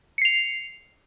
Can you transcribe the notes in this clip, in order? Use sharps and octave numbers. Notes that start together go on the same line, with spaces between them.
C7 C#7 F7